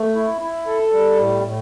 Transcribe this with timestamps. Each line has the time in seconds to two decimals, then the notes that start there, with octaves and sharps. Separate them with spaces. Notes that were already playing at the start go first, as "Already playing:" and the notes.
Already playing: A3
0.15 E4
0.41 E4
0.67 A4
0.92 G3
1.18 A2
1.44 A2